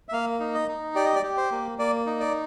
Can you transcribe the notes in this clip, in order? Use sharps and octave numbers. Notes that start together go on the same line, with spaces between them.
E5
A#3 F5
D#4
D#5
D#4
G4 D5
D#5
D5
G4
C5
A#3
A#3 D5
D#4
D5